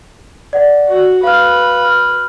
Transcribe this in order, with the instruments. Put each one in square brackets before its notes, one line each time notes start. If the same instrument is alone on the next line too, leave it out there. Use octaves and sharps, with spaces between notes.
[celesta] D5 F#5
[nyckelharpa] F#4
[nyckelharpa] B4 [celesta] F5 F6
[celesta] F6